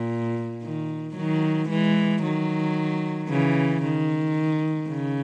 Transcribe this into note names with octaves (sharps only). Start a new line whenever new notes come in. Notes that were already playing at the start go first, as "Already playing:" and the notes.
Already playing: A#2
D#3
D#3 F#3
E3 G#3
D#3 F#3
C#3 E3
D#3
C#3